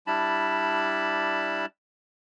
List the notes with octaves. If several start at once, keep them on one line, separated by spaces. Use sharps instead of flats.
G3 D4 E4 A5 B5